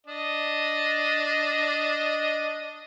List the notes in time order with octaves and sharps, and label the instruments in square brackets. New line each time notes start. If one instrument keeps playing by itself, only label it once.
[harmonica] D4 D#5